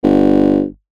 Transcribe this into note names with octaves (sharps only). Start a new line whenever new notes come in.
G1